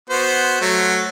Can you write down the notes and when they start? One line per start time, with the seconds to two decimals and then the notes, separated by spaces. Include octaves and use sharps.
0.10 B3 F#4 C5
0.61 F#3 A3